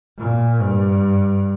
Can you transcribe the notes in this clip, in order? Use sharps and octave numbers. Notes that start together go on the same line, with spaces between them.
A#2
G2